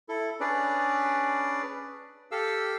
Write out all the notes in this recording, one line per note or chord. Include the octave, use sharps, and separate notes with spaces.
E4 A4
C#4 D4 G#4 B4 D5
G4 A4 F5 E6